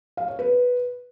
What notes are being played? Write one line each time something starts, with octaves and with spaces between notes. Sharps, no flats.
F5
C#5
B4